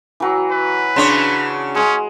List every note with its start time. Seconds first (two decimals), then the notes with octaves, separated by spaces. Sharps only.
0.20 E3 F#3
0.52 B4
0.96 C#3 D4 C#5 C6
1.75 G#3 C#4